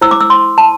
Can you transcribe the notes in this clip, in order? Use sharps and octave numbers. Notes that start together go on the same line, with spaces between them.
E4 C5 E6
D6
E6
C6
A5